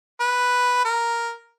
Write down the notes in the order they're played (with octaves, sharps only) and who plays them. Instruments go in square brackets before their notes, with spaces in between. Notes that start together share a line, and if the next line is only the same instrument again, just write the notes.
[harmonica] B4
A#4